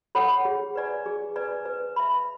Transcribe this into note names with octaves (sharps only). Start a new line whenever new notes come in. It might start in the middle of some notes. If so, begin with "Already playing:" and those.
A4 C#5 F#5 B5
G#4
B4 D5 G#5
G#4
B4 D5 G#5
B4
E5 B5